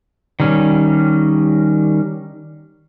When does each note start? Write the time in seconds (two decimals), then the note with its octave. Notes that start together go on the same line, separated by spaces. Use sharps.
0.40 D#3 G3 C#4